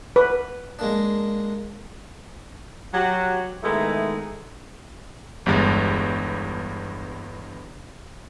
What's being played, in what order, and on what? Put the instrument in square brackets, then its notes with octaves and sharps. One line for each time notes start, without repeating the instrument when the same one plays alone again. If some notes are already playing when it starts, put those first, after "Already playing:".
[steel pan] B4
[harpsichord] G#3 A#3 D4
[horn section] F#3 F#4 G4
D#3 G#3 A3 B3 D#4 E4
[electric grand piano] G1 E2 G2 G#3 A6